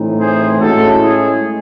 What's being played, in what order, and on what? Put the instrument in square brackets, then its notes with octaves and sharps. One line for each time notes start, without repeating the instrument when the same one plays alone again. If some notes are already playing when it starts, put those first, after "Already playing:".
Already playing: [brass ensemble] A2 E3 C4 D#4
G#4 C5
A2 G#3 C#4 E4 F#4 A4
E4 G#4